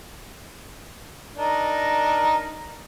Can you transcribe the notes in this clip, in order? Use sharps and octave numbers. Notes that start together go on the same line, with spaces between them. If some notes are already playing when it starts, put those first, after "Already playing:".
D4 D#4 A#4